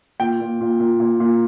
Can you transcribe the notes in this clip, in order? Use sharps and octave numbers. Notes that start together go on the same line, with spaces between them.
A#2 G5
A#2
A#2
A#2
A#2
A#2